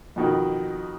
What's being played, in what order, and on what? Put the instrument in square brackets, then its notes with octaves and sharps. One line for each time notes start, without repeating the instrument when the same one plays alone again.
[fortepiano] F2 B2 D#3